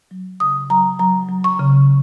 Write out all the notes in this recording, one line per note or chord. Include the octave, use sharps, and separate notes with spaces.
F#3
C#3 D#6
F#3 A#5
F#3 A#5
F#3
C#6
C#3